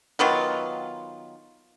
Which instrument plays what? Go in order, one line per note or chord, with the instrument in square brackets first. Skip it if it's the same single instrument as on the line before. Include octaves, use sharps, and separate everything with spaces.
[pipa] D#3 F#3 B3 F4